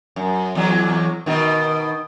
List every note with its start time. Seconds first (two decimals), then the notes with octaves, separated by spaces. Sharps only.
0.16 F#2
0.55 E2 F#3
1.26 B2 D#3